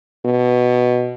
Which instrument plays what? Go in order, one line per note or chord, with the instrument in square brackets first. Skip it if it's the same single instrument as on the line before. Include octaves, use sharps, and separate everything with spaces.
[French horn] B2